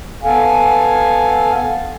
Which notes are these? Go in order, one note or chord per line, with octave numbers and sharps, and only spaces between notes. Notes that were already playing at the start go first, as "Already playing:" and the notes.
B3 A4 F5 G#5